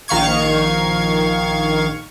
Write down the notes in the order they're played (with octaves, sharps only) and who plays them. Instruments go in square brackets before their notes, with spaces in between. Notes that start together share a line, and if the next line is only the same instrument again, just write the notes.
[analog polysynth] A#1 D#3 F5 C#6 G#6